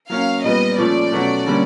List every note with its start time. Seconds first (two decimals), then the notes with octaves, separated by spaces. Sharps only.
0.10 F#3 A#3 C#4 F5
0.44 A#2 G3 B3 D#5
0.78 A#2 F3 A3 C#4 D5
1.12 B2 F#3 A3 C#4 F#4
1.46 D3 G3 A#3 C#4